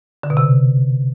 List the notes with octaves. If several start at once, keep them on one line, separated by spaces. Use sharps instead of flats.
D3
B2
C3